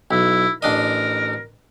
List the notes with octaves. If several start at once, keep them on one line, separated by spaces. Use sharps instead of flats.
B1 E4
A1 D4 A#4 D#5